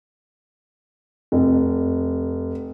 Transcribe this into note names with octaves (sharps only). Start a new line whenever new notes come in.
F1